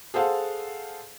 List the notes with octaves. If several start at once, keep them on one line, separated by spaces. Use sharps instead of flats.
G#4 A4 C5 F5 F#5 A5